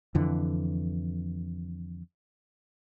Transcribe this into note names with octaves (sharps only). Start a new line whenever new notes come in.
F2 D3 E3